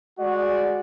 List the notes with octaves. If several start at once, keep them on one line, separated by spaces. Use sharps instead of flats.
G#3 F#4 D5